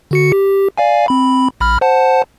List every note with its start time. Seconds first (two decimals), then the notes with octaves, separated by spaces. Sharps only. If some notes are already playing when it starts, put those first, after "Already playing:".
0.11 D3 F#4 C#7
0.32 G4
0.78 D5 F5 G#5
1.08 C4 B5
1.60 A#1 B5 F6
1.81 C5 F#5 A5